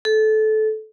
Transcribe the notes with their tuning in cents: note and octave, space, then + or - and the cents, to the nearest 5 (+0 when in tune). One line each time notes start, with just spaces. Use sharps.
A4 -20